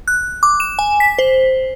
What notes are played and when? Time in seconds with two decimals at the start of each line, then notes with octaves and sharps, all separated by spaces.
0.08 F#6
0.43 D6
0.60 E7
0.79 G#5
1.00 B6
1.19 C5